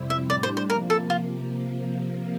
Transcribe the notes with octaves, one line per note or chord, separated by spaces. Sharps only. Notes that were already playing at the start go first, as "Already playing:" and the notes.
Already playing: F2 C3 G3 C4 E4
E5
A2 G3 D4 D5
C5
C5
C3 F3 A#3 A#4
A4
F4